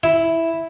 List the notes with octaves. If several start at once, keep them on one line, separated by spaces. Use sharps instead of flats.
E4